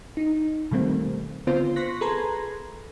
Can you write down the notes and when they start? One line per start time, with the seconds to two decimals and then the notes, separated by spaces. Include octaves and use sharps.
0.17 D#4
0.71 B2 D#3 G3 A3 A#3 C4
1.47 D3 B3 C4 F4 C5
1.76 C6 C#6 F#6 A#6 B6
2.01 G#4 A4 B4 A#5 C6 G#6